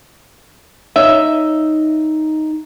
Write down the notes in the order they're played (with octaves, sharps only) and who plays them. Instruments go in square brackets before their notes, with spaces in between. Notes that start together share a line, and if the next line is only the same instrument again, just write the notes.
[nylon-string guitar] D#4 C#5 D#5 [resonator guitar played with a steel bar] E5